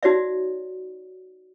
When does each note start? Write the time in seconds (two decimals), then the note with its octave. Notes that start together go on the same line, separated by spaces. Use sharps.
0.03 D#4 F#4 C#5 D5 E5